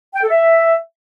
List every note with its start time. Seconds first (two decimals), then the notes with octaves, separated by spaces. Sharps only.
0.15 G5
0.22 A4
0.30 E5